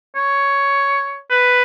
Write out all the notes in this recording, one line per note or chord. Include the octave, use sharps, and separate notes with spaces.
C#5
B4